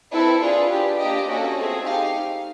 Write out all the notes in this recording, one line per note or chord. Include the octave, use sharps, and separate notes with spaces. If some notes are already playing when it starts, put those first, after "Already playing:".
C4 E4 A4 B4
D4 F4 G#4 B4
D4 G4
A#3 D4 G4 D#5
A#3 C#4 F#4 A4 D#5
A3 C4 F4 G#4
D#4 G4 F5